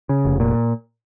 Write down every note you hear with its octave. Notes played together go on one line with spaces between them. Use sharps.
C#3
F1
A#2